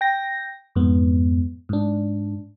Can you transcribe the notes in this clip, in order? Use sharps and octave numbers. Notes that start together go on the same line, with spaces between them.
G5 A#6
F2 G#2 B3
G#2 D4